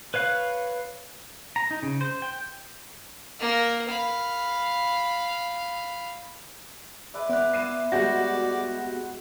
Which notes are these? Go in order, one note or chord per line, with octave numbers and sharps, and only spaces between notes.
B4 C#5 F5 F#6
A#5
D#4
C#3
C5
G5
A#3 A#4
F5 B5
G#3 B4 D5 E5
B3 D5 F#6
E4 B4 C7 D#7 E7
G3 G#3 B3 F#4 D5 G6 A#6